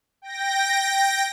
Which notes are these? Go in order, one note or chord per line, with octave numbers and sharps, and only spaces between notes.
G5 A#6